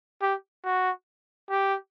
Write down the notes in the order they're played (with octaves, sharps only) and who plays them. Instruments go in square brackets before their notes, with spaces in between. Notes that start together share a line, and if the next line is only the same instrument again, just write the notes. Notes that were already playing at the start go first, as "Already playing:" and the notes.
[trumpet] G4
F#4
G4